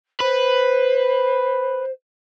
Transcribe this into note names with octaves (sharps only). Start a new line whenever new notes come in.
B4 C5